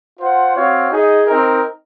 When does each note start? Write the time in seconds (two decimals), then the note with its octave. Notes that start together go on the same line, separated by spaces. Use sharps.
0.20 F4 C5 F#5
0.55 C4 F#4 C#5 F5
0.91 D#4 G#4 D#5
1.26 C4 D#4 A#4